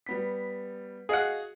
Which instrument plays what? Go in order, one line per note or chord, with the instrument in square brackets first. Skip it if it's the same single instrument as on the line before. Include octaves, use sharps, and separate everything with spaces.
[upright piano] G3 B3 B6
[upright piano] F#4 D#5 F5 [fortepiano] G#4 F#5